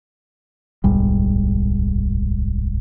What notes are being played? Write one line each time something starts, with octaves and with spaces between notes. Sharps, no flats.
D1 B1 G#2 G3